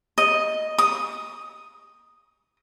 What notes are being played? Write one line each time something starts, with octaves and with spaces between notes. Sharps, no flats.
D#5
D#6